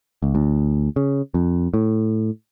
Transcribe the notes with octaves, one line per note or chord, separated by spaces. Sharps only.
C#2
D2
C#3
F2
A2